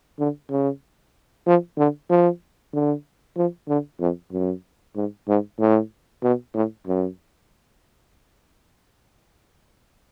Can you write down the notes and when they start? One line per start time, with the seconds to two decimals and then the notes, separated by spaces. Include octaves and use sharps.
0.19 D3
0.50 C#3
1.46 F3
1.78 D3
2.10 F3
2.73 D3
3.36 F3
3.68 D3
4.00 F2
4.32 F#2
4.96 G#2
5.28 G#2
5.60 A2
6.23 B2
6.54 A2
6.87 F#2